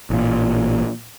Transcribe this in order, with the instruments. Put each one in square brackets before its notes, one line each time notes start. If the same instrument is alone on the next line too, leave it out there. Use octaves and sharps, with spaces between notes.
[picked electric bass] A1 A#2